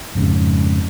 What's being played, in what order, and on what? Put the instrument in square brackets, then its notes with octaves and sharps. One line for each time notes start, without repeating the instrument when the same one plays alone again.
[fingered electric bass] F2 G#2 C#3